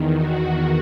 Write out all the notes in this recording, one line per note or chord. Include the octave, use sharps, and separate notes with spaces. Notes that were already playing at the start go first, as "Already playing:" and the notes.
Already playing: E2 D#3
F#4